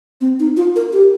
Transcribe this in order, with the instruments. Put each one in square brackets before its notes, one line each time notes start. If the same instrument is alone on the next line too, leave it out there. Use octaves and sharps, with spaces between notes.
[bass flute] C4
D#4
F4
A#4
G4